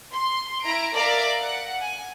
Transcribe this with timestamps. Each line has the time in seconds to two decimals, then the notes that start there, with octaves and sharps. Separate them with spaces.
0.14 C6
0.62 E4 A#5 D7
0.95 A#4 D5 E5 F5 A#5 D6
1.40 F#5
1.82 G#5